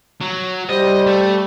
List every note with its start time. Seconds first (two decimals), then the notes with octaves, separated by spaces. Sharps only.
0.21 F#3
0.69 G3 C5 D#5
1.06 A3